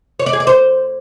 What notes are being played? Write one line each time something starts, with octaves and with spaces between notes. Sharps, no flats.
C#5
D5
G#4
D5
C5